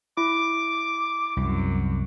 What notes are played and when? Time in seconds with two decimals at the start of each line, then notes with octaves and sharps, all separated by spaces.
0.17 E4 D6
1.37 C2 F#2